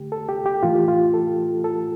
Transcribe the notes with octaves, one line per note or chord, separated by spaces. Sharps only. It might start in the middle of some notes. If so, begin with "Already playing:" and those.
Already playing: D3 A3 G4
A4
G4
G4
A2 E3 A3 F4
G4
F4
A4
A4